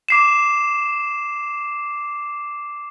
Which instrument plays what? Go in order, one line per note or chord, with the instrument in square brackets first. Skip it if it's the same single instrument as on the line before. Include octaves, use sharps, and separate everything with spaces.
[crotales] D6 C7 E7